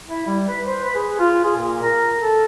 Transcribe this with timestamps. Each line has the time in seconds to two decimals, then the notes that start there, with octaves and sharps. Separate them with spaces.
0.08 E4
0.27 G3
0.48 B4
0.65 C5
0.83 B4
0.95 G#4
1.19 F4
1.44 G#4
1.56 A#2
1.82 A#4
2.21 A4